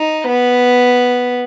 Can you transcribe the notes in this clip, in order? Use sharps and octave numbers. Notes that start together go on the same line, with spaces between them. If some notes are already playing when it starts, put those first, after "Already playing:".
Already playing: D#4
B3